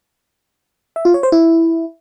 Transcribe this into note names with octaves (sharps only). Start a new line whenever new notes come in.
E5
F4
C#5
C5
E4